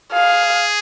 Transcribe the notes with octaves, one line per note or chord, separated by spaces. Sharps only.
G#4 F5